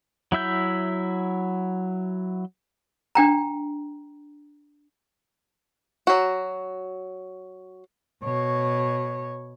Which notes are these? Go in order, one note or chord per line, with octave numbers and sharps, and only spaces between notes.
F#3 E4 E5 G6
D4 G5 A#5
F#3 F#4
B2 C#5